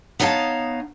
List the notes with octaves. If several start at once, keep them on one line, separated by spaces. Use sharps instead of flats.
B3 D#4 C#5 E5 F5 A5